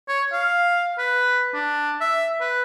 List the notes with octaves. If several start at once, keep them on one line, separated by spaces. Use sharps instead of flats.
C#5
F5
B4
D4
E5
B4